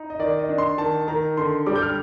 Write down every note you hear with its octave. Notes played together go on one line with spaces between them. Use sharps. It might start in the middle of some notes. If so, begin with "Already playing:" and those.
Already playing: D#4
D#5
D#3 D5
D#5
D4
C6
D#3 A5
D#3 A#5
D3 C6
G3 D6
G6
F6